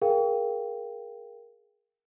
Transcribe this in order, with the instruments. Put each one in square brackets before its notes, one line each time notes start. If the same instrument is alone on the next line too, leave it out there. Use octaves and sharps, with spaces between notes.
[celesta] G#4 A#4 F5 G5